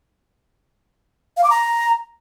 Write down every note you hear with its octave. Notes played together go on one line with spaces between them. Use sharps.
F5
D6
A#5